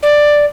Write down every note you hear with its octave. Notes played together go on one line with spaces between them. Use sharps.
D5